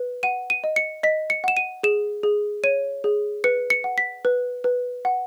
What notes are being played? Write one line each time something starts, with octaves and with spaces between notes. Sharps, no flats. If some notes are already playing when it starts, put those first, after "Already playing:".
Already playing: B4
F#5 D#7
D#7
D#5
C#7
D#5 B6
C#7
F#5 E7
D#7
G#4 E7
G#4
C#5 D#7
G#4
B4 C#7
C#7
F#5
B6
B4
B4
F#5